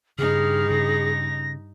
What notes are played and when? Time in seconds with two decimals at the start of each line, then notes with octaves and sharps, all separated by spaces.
0.19 G2 C#3 D#4 G#4 F6
0.70 C#3 A#6